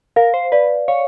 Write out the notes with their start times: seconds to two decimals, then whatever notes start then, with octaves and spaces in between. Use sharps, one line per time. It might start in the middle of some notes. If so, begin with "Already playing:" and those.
0.16 A#4 F5
0.34 C5
0.52 B4 D5
0.88 C#5 F5